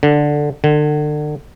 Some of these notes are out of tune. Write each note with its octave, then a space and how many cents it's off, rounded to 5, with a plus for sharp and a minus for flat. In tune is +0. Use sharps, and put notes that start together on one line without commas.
D3 +5
D3 +35